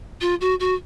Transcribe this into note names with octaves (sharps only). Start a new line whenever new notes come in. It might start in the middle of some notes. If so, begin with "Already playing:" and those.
F4
F#4
F#4